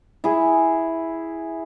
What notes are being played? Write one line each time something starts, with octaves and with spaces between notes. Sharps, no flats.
E4 G#4